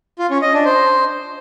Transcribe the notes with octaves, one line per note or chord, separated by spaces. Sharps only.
F4
C#4
D#5
D4
C5